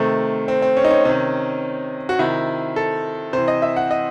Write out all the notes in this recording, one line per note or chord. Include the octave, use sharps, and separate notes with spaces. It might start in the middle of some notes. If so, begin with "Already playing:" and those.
Already playing: C3 D#3 A3
C4
C4
C#4
D#4
C#4
C3 D#3 C#4
F#4
C3 D#3 E4
A4
C3 E3 C5
D#5
E5
F#5
D#5